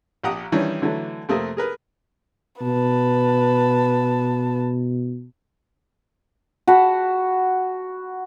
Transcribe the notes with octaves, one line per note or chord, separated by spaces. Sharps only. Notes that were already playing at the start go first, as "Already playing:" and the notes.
A#1 G4 F#5 A#5 D#6
D#3 E3 G3 C#4 D4
D3 E3 F#3 A3
F2 C3 A3 A#3 C4 D#6
G#4 A#4 B4
B2 B4 A5
F#4 F#5 A5 B5